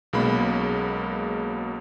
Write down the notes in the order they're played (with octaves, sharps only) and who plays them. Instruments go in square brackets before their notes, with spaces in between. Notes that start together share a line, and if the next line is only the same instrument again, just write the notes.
[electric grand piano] B1 B2 G#3 A#3 C#4 B5